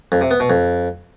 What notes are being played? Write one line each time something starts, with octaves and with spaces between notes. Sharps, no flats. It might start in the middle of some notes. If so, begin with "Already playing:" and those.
F2
C3
B3
B2
F2